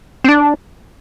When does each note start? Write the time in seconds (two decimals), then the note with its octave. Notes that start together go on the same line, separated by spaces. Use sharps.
0.24 C4
0.29 D4